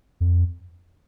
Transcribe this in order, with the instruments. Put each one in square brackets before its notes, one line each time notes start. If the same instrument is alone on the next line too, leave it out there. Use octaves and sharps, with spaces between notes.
[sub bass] F2